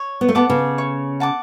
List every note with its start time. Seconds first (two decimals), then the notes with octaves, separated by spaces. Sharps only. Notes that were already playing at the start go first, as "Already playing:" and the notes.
Already playing: C#5
0.21 B3
0.28 A3
0.35 B3 F#5 A5 D6
0.50 C#3
0.78 C#5
1.20 F#5 A5 D6